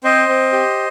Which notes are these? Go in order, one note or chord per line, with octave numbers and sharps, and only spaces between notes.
C4 C5 D#5
C4
G4